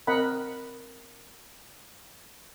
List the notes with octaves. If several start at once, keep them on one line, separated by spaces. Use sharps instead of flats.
C4 A#4 D#5 F#5 B5